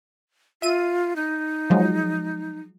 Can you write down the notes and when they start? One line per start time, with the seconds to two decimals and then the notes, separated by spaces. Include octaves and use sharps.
0.62 F4 E5 D#7
1.16 D#4
1.70 F3 F#3 G#3